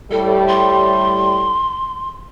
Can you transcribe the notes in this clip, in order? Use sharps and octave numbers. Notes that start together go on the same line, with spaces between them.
A2 G3 A4
C6